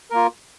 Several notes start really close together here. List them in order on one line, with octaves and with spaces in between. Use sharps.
A#4 A#3 F4